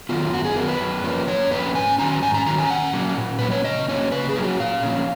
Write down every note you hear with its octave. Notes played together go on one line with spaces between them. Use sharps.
D#3 F#3 B3 F4
F#2 F#4
G#4
D#3 F#3 B3 A#4
B4
F#2
F3 A#3 C#4
F#2 C#5
F3 A#3 C#4 B4
G#2 G#5
D#3 F#3 C#4 A#5
G#2 G#5
A#5
D#3 F#3 C#4 A#5
G#5
A#2 F#5
F#3 A#3 C#4
A#2
F#3 A#3 C#4 B4
C#5
C#3 D#5
F#3 A#3 C#4 C#5
C#3 B4
G#4
F#3 A#3 C#4
F#4
A#2 F5
F3 A#3 C#4